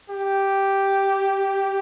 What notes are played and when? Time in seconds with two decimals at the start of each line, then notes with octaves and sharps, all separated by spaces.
0.10 G4